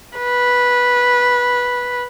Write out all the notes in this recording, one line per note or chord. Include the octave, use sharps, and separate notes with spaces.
B4